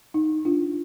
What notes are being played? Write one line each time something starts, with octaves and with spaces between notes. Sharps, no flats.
D#4
D4 F4